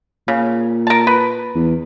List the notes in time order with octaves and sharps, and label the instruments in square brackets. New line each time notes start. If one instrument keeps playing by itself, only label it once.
[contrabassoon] A#2 [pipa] C#3
[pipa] A#4 A5
B4
[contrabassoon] E2